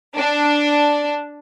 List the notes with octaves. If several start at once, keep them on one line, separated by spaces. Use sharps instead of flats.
D4